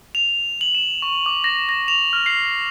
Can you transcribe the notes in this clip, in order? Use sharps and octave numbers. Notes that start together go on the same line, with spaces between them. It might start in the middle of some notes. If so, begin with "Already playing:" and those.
F7
F#7
E7
C#6
D6
A#6
A#6
F7
F6
C7